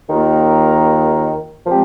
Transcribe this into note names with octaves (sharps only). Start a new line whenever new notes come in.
D#2 D#3 A#3 F4 A#4
A#2 F3 G#3 C4 G4